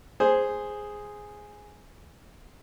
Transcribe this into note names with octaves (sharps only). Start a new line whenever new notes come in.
G#4 C5